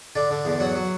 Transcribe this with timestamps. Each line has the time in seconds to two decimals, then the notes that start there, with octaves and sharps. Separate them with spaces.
0.15 D3 D5
0.31 D3
0.45 E2
0.60 F#3 F#5
0.75 F#3